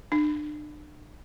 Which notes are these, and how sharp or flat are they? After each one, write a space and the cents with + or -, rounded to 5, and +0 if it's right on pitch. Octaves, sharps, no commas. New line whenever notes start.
D4 +35